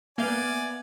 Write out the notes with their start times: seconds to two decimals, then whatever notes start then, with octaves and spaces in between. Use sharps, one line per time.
0.18 A#3 B3 B4 D5 E5 F5 G#5 G6